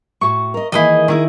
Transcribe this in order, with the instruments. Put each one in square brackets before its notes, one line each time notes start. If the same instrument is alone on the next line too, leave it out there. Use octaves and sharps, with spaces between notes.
[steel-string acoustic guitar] A2 F#4 [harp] C#6
[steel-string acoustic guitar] A#4 D#5
[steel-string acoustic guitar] D#3 E3 A#3 [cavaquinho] E4 G#4 D#5
[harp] D#3 E4 [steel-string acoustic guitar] G#4 A#4